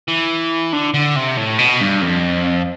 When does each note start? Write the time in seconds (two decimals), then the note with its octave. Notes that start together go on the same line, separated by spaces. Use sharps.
0.08 E3
0.73 D3
0.94 D3
1.16 C3
1.37 A2
1.58 B2
1.81 G2
2.01 F2